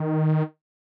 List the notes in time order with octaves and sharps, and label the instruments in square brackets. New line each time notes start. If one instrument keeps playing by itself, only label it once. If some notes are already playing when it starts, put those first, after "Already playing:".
Already playing: [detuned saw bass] D#3